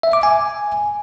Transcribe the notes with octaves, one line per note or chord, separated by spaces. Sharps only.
E5
D6
G#5